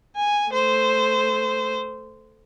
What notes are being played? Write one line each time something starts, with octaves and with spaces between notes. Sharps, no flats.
G#5
A3 C5